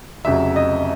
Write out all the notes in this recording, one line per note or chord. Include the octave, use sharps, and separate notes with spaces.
F1 F2 C#3 F#3 E5
D#5